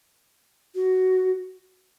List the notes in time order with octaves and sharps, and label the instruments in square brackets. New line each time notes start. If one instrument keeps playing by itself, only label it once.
[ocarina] F#4